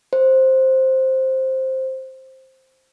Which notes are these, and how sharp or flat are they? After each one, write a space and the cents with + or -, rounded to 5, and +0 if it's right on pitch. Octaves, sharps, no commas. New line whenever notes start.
C5 +5